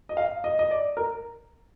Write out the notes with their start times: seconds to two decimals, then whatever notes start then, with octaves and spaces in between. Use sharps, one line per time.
0.09 D#5
0.17 F5
0.44 D#5
0.59 D#5
0.71 D5
0.97 A#4